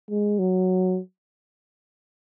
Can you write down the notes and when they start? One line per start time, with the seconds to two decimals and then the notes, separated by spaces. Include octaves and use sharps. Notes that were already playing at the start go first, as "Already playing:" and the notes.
0.10 G#3
0.39 F#3